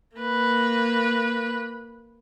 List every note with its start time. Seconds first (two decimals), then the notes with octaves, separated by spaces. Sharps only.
0.17 A#3 B4